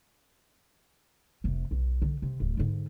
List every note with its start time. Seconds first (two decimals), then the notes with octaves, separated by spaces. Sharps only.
1.44 F1 C3
1.71 B1
2.02 D3
2.22 C3
2.40 D1 F#3
2.57 G#2 D3